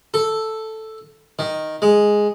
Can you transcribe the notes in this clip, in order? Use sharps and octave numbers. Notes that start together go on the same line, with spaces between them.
A4
D#3
G#3